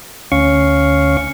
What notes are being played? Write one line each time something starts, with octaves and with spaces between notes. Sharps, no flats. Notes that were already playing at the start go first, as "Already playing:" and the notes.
D2 C#4 F5 C#6